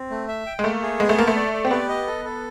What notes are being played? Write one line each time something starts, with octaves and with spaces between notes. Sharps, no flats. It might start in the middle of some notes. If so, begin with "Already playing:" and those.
Already playing: C4
A3
E5
G5
G#3
A3 A#3
G#4
G#3 B3
A3
A#3 A4
A3
D5
D5
C4
B3 G4
D#5
A4
A4